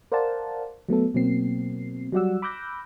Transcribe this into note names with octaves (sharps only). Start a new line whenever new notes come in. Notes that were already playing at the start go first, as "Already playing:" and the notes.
A#4 C5 D5 F5 F#5 A5
F#3 A3 B3 A4
B2 F#3 A#3 C4 C7
F#3 G3 F#4 D5 F#5 E6
B5 D6 E6 F#6 G6 A#6